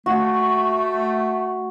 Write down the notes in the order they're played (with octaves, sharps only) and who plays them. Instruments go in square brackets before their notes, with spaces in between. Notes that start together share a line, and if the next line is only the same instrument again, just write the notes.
[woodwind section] A3 [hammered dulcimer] F#4